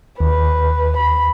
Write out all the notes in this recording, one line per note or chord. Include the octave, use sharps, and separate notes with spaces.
D#2 B4
B5